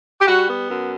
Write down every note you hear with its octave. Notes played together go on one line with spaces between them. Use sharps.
G4
G3 F#4
B3
F#2